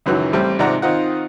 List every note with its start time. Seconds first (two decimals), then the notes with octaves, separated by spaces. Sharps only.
0.06 C#2 F#2 D#3 E3 F#3 F#6
0.33 A1 G3 C4
0.59 G#2 C3 F3 D5 F#5 A#5
0.82 D#3 C4 D#4 F4 F#5